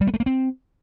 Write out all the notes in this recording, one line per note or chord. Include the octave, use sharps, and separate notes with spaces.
G3
B3
A3
A#3
C4